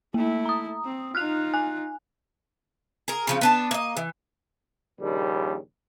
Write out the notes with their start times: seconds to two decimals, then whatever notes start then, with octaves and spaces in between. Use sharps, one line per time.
0.14 A3 A#3 E4
0.46 A#5 D#6
0.85 C4
1.15 D#4 F4 F6 F#6 F7
1.54 G#5 F#6
3.08 G#4 A#4
3.27 C#3 F3 C4
3.41 B3 D4 A5
3.71 A#3 D#5
3.97 E3
5.00 A#1 D#2 C#3 G3